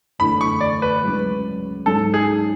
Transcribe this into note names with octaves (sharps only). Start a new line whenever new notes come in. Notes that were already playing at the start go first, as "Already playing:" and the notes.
F#1 E2 D3 A3 B5
C#6
D5
B4
C#2 C#3 F#3
G#2 F#3 C#4 A4
G#4